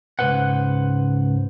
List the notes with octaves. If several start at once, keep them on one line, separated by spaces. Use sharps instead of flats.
C#2 G#2 C3 B4 C5 F#5